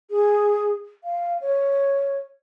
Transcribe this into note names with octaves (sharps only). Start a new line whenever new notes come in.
G#4
F5
C#5